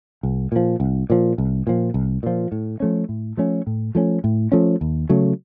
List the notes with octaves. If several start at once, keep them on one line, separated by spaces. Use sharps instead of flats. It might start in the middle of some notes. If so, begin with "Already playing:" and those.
C2
A#2 F3
C2
A#2 F3
C2
A#2 F3
C2
A#2 F3
A2
F3 A3 C#4
A2
F3 A3 C#4
A2
F3 A3 C#4
A2
F3 A3 C#4
D#2
C#3 F#3 A3